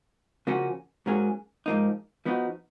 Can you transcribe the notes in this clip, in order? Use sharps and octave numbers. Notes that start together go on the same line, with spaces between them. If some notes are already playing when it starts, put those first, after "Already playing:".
C#3 F3 A#3 C#4 F#4
G#2 F#3 A#3 C#4 G#4
G#2 F3 A#3 D#4
F3 B3 D#4 F#4